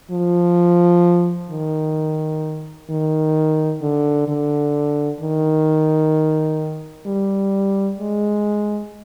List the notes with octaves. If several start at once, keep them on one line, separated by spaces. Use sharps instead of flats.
F3
D#3
D#3
D3
D3
D#3
G3
G#3